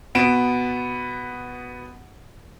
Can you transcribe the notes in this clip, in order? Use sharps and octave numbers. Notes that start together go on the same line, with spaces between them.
B2 B3 D7 E7